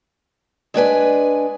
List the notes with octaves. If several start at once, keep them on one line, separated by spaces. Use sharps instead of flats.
G#3 D4 B4 G#5